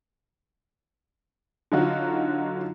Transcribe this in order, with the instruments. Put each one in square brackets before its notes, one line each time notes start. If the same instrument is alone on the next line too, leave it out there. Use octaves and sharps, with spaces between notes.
[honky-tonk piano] D3 F#3 D#4 F4 F#4